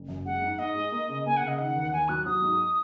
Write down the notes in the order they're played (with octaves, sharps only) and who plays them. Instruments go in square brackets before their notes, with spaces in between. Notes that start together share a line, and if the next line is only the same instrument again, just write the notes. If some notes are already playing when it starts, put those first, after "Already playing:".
Already playing: [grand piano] F#1
F#2
[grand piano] G#3 [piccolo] F#5
[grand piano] G#2
[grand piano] G#2 [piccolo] D#5
[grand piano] G#3
A#3
C#3
[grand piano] A#3 [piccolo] G#5
[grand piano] C#3 [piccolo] F#5
[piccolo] D#5
[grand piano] D#3 [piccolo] F#5
[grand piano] D#2
[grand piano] D#2 [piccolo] G#5
[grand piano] F#3 [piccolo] F#6
[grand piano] F#3 [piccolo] D#6
[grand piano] G#2